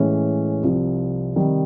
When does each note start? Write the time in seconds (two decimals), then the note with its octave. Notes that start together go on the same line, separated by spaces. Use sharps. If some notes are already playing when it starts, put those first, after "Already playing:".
Already playing: A2 E3 G#3 C#4
0.63 C2 C3 F3
1.36 C3 D#3 G3